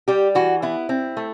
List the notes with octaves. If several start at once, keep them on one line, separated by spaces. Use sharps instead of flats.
G3 G4
E3 F#4
B3 E4
C4
A3